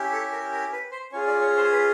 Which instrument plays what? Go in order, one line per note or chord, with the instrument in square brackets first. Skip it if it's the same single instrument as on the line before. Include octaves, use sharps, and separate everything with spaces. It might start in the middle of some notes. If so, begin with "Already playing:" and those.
Already playing: [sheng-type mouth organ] C#4 E4 G4
A4
A#4
A#4
B4
C5
C#4 F4 G#4 C#5
D5
C#5
C5
B4